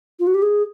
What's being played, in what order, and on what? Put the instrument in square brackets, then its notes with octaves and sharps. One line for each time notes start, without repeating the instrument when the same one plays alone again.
[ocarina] F4
F#4
G4
G#4